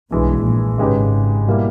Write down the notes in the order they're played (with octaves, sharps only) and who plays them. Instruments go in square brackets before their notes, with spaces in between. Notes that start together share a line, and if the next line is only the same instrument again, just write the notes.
[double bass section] B1 B2 [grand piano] G2 E3 G#3
[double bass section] A#1 A#2
[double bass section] G#1 G#2 [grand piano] C#3 G#3 D#4 G4 B4
[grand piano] B2 G3 A#3 E4